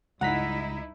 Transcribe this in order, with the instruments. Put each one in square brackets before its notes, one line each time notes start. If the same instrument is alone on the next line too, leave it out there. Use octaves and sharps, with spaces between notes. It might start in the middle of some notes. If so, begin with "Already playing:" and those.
[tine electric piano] C#2 A#5 B6 [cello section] G2 D#4 E4 [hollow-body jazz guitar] F#5